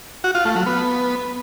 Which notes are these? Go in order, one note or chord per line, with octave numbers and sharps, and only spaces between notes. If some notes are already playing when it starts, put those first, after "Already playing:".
F#4
F4
A3
F#3
B3